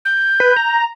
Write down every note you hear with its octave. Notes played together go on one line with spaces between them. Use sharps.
G6
B4
A#5